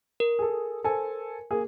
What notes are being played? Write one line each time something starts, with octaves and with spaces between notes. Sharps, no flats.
A#4
G#4 A4
A4 C5 G#5
A#3 G#4